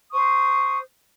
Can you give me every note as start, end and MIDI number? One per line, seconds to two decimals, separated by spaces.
0.12 0.79 72
0.12 0.79 85
0.12 0.79 87